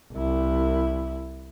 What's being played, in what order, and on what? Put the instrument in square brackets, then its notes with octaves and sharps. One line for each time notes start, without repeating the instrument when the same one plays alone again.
[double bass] C2 E4